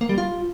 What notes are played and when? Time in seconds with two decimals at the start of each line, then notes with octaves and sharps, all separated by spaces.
0.01 A#3
0.09 G3
0.18 F4